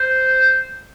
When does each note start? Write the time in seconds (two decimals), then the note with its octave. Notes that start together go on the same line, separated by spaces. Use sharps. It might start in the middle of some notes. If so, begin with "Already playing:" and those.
Already playing: C5